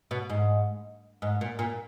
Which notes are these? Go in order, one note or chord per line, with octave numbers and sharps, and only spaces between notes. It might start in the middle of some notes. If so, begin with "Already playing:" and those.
B2
G#2
G#2
A#2
A#2